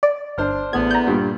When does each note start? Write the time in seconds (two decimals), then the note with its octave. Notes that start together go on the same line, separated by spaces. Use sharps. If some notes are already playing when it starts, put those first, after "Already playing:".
0.03 D5
0.38 G1 D4 C5 F6
0.73 A1 E2 D3 B3 G#6
0.91 A#5 G6
1.07 G2 A#2 G3